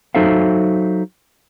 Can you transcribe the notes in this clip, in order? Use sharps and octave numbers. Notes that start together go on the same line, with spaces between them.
F#3 D#4 A4 C5 E5 F5